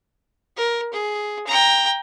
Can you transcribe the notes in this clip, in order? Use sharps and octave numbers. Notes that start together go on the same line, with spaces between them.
A#4
G#4
G5 A#5